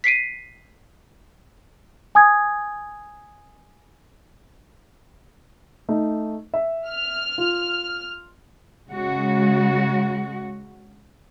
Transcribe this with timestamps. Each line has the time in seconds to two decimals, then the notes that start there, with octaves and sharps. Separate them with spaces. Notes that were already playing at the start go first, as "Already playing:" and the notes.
0.04 B6 C7 D7 D#7
2.15 G#5 D#6 G#6
5.89 A3 D#4
6.54 E5
6.90 F6
7.38 F4
8.88 C#3 G#3 F#4